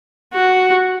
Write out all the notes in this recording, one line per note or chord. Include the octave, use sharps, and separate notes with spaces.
F#4